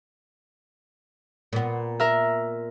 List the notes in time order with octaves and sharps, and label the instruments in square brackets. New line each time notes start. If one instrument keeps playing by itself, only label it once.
[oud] A#2 B3
[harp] A#4 E5